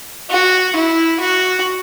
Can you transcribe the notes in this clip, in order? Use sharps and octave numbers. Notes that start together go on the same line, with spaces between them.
F#4
E4
F#4